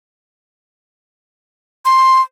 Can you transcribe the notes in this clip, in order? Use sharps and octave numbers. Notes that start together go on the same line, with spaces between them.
C6